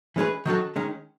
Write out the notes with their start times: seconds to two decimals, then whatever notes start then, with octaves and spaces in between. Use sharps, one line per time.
0.16 E3 G#3 C#4 G#4 B4
0.46 D#3 F#3 C#4 F#4 A4
0.76 D#3 G#3 C#4